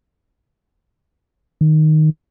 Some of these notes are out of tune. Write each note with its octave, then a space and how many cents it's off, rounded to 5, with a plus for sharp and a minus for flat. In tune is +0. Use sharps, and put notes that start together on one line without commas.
D#3 -5